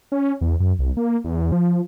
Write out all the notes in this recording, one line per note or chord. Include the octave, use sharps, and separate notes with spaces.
C#4
E2
F#2
C2
A#3
E2
F3